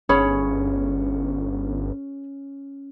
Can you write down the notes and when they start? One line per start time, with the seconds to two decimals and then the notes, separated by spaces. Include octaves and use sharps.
0.09 G1 C#4 G#4 C#5 B5